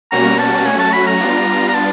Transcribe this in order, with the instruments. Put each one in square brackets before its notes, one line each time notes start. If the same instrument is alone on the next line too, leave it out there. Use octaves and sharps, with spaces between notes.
[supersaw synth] B2 G3 A#3 C#4 F#4 [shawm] A#5
[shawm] A5
[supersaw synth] F#3 A3 C#4 F#4 [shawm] G#5
[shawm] A5
B5
A#5
[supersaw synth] G3 B3 D4 F4
[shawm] A#5
A5